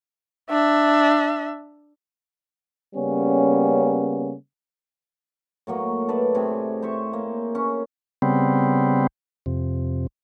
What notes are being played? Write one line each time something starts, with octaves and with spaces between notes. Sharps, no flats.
D4 E5
C#3 G3 A#3 B3 C#4
A2 F#3 A#3
A4 B4 D5 E5
A2 C3 G#4
C5 C#5 E5 C#6
A#3
C#4
C#3 G3 B3 C4
F2 C3